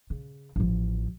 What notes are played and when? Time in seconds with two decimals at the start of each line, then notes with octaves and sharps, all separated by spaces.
0.10 C#3
0.56 A1 F3